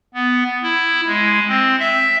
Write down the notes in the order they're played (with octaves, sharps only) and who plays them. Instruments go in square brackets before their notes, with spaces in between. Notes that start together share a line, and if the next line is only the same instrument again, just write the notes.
[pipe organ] B3
E4
G#3
C4
E5